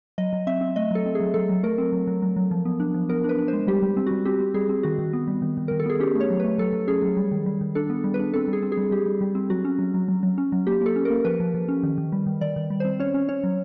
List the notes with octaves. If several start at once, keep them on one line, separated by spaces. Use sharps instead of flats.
F#3 D#5
F#3
C4 E5
C4
A3 D#5
F#3 A4
C4
G#4
F#3
F#3 A4
F#3
A3 A#4
C4
F#3
F#3
F#3
F#3
F3
B3
D4
F3
B3 A#4
D4
B4
D4
G#3 C5
G3 G4
G3
C4
G3 F#4
C4 G4
C4
G3 G#4
C4
D#3 F#4
D#3
B3
G3
D#3
D#3
D#3 A#4
A4
B3 G#4
C#4 G4
A3
C#5
F#3
A3 B4
F#3 A4
F#3
C#4 G#4
F#3
G3
D#3
G3
D#3
D4 A4
B3
G3
B4
D4
C4 A4
G3
G#4
C4
G#4
G3
G3 G4
G3
G3
C4
F#3 F#4
C#4
F#3
F#3
F#3
F#3
C#4
F#3
A#3 G4
A#3 A4
C#4
A#3 A#4
F3 B4
F3
F3
C#4
D#3
D#3
G3
D#3
D#3 D5
D#3
G3
C4 C5
C#4 C#5
C#4
C#4 C#5
F#3